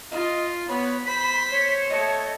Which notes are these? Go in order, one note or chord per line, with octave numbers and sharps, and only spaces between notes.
F4 D#5
B3 C#5 B5
C5 B6
C#5
A3 D#5